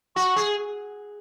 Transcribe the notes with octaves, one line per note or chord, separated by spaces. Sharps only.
F#4 C#6
G#4